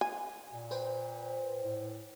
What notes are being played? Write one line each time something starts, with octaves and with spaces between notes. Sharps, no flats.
G#5
A#2
B4 C5 G5
A2